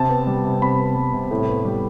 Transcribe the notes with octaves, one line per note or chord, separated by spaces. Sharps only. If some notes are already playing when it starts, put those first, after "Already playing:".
Already playing: C3 A5
B3
G3
C3
C3 B5
B3
G3
C3
A2
B3
G3